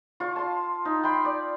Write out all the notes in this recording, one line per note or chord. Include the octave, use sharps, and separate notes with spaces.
F4 C#6
A5 C6
D#4
G5 B5 C6
D5